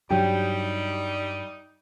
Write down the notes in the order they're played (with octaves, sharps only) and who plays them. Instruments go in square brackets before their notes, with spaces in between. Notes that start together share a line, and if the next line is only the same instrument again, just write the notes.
[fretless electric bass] G2 F#3 [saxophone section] G3 D#4 [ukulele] G4